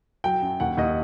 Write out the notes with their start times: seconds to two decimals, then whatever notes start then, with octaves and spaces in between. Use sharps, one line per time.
0.24 F#3 G5
0.42 F#2
0.60 D#2 F#5
0.77 D#2 D#5